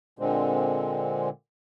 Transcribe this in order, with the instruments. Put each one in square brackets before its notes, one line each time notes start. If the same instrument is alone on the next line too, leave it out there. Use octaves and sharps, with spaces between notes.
[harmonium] A#2 D3 G#3 C4